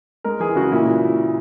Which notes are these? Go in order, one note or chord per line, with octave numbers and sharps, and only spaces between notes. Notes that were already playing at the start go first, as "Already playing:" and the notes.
G#3 A#4
E3 G#4
C#3 F#4
A#2 E4